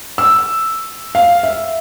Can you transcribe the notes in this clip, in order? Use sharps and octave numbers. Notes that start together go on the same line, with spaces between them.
E6
F5
E5